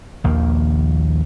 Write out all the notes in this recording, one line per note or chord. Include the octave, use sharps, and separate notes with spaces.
A#1 D#2 D#3 A#3